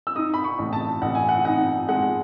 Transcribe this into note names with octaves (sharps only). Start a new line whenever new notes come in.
E6
D#4 D#6
B5
C#6
A1
A5
A1 F#5
G#5
F#5
D#4 F#5
G#3 F#5